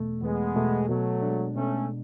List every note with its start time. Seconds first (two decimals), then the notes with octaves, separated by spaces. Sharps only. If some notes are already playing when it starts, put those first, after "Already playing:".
Already playing: E2 B2 A3
0.22 E2 G#3 B3
0.56 B2 A3
0.89 B2 F#3 A3
1.22 G#3 D4
1.56 B2 A3 C#4